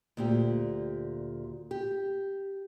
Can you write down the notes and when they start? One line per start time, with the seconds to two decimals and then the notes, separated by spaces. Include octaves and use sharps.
0.17 D2 A#2 G4
1.71 G4